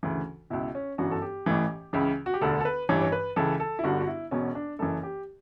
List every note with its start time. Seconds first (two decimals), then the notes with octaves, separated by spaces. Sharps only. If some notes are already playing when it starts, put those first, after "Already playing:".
0.03 D2 C#3 E3
0.50 C#2 B2 E4
0.75 C#4
0.98 G1 F#2 E3 F#4
1.11 A4
1.22 G4
1.46 A1 A2 E3
1.93 C#2 C#3 E3
2.26 F#4
2.34 G4
2.41 E1 D2 D3 A4
2.61 A4
2.65 B4
2.89 A1 G2 E3 C#5
3.01 C#5
3.12 B4
3.36 C#2 C#3 E3 A4
3.60 A4
3.79 E4
3.83 G1 G2 D3 F#4
4.01 F#4
4.07 E4
4.31 E1 E2 B2 C#4
4.55 D4
4.79 F#1 F#2 E3 A4
5.03 G4